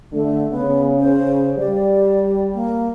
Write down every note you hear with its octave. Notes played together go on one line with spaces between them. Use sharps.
D3 A3
C#3 B3
C5
G3 D5
A#3